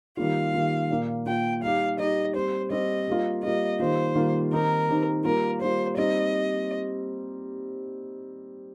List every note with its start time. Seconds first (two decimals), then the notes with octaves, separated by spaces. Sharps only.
0.17 D#3 G3 A#3 F4 F5
0.54 D#3 G3 A#3 F4
0.90 A#2 A#3 F4
1.26 A#2 A#3 F4 G5
1.63 G3 D#4 G4 F5
1.98 G3 D#4 G4 D#5
2.35 G3 C4 G4 C5
2.70 G3 C4 G4 D#5
3.08 G3 A#3 F4
3.43 G3 A#3 F4 D#5
3.80 D#3 G3 A#3 F4 C5
4.15 D#3 G3 A#3 F4
4.52 D#3 C4 D#4 G4 A#4
4.88 D#3 C4 D#4 G4
5.24 G3 A#3 F4 A#4
5.61 G3 A#3 F4 C5
5.97 G3 C4 D#4 G4 D#5